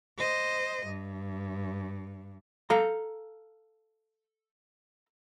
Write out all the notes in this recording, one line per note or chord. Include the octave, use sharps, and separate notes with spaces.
C5 D#5
G2
A4 F5 A#5